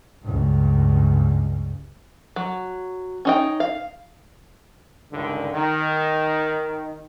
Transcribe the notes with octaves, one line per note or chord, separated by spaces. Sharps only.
C#2 G2
F#3
C#4 D#4 G5
F5
C#2 G2 D3 D#3
D#3